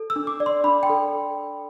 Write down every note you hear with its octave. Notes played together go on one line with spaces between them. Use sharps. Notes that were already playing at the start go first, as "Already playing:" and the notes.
Already playing: A4
E6
D4
D6
D5
C6
D4 B5
G5
A4